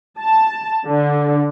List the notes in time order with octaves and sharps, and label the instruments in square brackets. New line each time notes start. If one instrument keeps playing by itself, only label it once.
[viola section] A5
D3